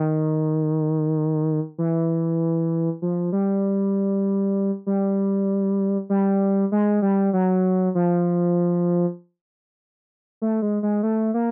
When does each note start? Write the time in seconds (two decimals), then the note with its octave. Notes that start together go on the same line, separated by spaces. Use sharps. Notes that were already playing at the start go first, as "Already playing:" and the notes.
Already playing: D#3
1.78 E3
3.02 F3
3.32 G3
4.87 G3
6.09 G3
6.72 G#3
7.02 G3
7.33 F#3
7.95 F3
10.42 A3
10.62 G#3
10.83 G#3
11.03 A3
11.34 A#3